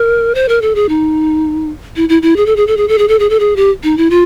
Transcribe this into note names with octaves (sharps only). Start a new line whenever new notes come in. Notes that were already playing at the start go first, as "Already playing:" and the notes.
Already playing: A#4
C5
A#4
A4
G#4
D#4
E4
E4
E4
G#4
A4
G#4
A4
G#4
A4
G#4
A4
G#4
A4
G#4
G4
D#4
E4
F4